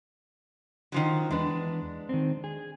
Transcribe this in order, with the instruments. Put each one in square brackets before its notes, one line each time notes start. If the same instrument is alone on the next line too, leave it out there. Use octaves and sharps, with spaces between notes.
[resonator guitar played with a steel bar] D#3 F3 F#3
[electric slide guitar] E2 B4 [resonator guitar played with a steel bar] G#3 D4
[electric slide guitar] D#3 C4
G#4